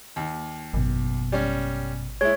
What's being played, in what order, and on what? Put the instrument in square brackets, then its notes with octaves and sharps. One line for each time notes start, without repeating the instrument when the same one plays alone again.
[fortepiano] D#2
[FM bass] G#1 [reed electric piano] F#2 B2
[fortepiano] G3 C#4
[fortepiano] G#3 E4 [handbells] C#5